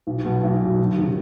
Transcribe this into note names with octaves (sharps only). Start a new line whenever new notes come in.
B1
B2 F#3
B1
B2 F#3
G1
C3 D#3